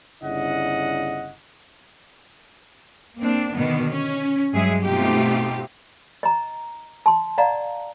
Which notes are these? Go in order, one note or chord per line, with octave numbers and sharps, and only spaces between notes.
G1 C#3 D4 E4 D#5 F#5
A#3 C4 D4
B2 D3 D#3 B3
C#4
G2 F#3 G#3 G#4 E5
B2 A3 C4 D#4 F4 G4
D#5 A#5
A5 C6
D5 D#5 F5 F#5 A#5